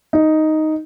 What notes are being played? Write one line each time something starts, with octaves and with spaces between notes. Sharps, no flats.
D#4